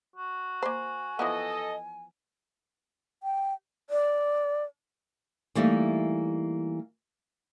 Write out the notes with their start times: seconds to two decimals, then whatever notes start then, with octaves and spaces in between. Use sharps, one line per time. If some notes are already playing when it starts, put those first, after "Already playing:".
0.16 F#4
0.63 A#3 C5 G#5
1.19 E3 F3 B3 A4 D#5
3.23 G5
3.90 D5
5.55 E3 G3 A3 A#3 D#4